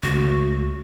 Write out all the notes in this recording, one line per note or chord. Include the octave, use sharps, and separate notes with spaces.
C#2 A3 F#4